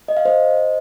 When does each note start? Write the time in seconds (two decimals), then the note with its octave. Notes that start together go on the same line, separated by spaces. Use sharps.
0.08 D#5
0.17 F5
0.25 C5 D#5